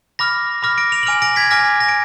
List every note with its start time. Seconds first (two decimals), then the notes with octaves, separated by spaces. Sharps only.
0.19 B5 D6 F6 A#6
0.63 B5 D6 F6 A#6
0.78 A#6 D7
0.92 D7 F7
1.03 F#7
1.06 G#5 D6 F6 D7 F7
1.22 A#6 D7
1.36 G#6 B6
1.51 G#5 D6 F6 A#6
1.80 A#6
1.89 D7